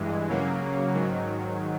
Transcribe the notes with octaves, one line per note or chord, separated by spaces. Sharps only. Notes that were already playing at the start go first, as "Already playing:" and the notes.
Already playing: G2 E3 G#3
C#3 F#3 A#3
G#2 D#3 F#3